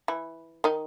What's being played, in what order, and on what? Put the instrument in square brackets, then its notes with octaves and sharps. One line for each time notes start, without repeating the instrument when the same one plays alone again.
[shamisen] E3 E4
D#3 D#4